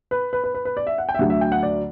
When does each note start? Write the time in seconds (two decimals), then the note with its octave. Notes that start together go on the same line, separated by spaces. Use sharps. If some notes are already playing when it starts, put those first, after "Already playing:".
0.11 B4
0.33 B4
0.44 B4
0.55 B4
0.65 B4
0.77 D5
0.87 E5
0.98 F#5
1.09 G5
1.15 E5
1.19 D2 D3 F#3 A3 F#5
1.30 E5
1.41 G5
1.52 F#5
1.63 D5